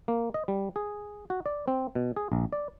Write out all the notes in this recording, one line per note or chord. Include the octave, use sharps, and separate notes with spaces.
A#3
D#5
G3
G#4
F#4
D5
C4
B2
G#4
A#1
D5